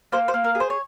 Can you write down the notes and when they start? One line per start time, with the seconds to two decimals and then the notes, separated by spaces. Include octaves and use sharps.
0.12 A#3 C5
0.28 C5
0.34 A#3
0.44 A#4
0.55 G#4
0.60 C5
0.70 C#5